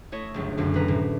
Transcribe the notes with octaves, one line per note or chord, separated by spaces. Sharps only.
A3 E4 C#5 D#5
G1 C#2 F#3
B1 F#2 D3
D#1 D#3 B4 A#5
C2 A2 D3